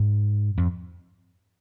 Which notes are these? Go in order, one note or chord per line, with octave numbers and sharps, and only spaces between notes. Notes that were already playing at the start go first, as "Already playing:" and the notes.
Already playing: G#2
F2